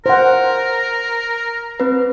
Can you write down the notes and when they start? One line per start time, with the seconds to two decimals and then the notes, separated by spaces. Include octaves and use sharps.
0.06 A#4 C5 F#5
1.80 C4 B4